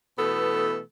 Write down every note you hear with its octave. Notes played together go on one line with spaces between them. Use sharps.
B2 E3 A3 B3 A4